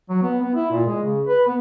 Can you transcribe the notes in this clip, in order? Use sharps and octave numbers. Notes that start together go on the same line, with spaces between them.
F#3
B3
B3
E4
A#2
G#3
C#3
B4
B3